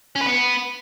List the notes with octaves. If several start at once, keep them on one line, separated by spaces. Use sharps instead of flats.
C#4
B4
B3